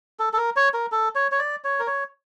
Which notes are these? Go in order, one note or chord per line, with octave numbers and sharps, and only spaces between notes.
A4
A4
A#4
C#5
A#4
A4
C#5
C#5
D5
C#5
A#4
C#5